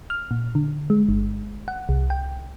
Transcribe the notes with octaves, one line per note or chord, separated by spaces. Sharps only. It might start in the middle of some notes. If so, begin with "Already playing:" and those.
F6
A#2
D3
G#3
G1
F#5
C2
G5